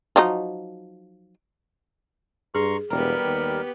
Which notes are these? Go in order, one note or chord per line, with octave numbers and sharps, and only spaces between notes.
F3 F#3 D#4
G2 G#4 A#5 C6 C#6
E1 G3 B3 G4 A#4 A#5
D#2